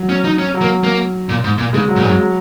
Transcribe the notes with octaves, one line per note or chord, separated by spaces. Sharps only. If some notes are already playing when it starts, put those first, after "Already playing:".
Already playing: F#3
C#4
D#4
C#4
F#3
A#3
A#3
A#2
G#2
A#2
C#3 G#3
F#3
A#2
F#2 G#2 G#3
F#3